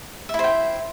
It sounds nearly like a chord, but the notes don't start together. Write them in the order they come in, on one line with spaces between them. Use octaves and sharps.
E5 E4 C5 G5